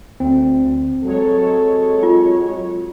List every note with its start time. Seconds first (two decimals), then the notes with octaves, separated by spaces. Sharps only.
0.20 D2 C4
1.03 F#3 G#3 A4 C#5
2.03 F4